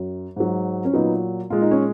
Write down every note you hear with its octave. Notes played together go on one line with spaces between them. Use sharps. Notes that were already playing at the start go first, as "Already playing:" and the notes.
Already playing: F#2
G#2 F#3
C#4
A#2 F#3 B3 D#4
A#2 G#3 F4
D#4
C#4